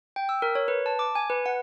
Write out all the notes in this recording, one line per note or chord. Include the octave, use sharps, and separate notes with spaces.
G5
E6
A#4
C#5
B4
A5
D6
G#5
B4
F#5